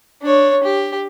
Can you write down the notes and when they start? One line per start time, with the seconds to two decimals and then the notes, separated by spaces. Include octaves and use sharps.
0.22 D4 C#5
0.64 G4